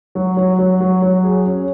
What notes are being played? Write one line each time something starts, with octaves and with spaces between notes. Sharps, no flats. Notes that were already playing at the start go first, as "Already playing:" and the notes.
F#3
F#3
F#3
F#3
F#3
G#4
C#4